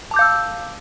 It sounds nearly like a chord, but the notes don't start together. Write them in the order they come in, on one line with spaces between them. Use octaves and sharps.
A5 D6 G6 F5 E6